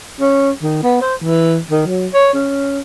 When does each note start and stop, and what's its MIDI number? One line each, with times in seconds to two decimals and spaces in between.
0.21 0.50 61
0.62 0.81 51
0.83 0.99 59
1.01 1.15 72
1.23 1.57 52
1.71 1.83 51
1.86 2.07 54
2.14 2.29 73
2.34 2.79 61